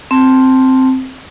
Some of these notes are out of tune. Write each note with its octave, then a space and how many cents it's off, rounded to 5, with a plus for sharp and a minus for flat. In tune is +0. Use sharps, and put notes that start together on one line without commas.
C4 +0 A5 +0